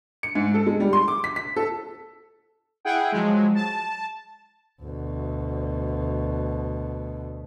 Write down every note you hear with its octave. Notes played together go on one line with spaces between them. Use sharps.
C#7
G#2
A4
G#3
G3
C6
D6
B6
B6
A4
E4 G#4 F#5 G5
F3 F#3 G#3
A5
D2 B2